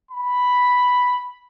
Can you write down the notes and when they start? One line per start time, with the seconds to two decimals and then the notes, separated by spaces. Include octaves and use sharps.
0.11 B5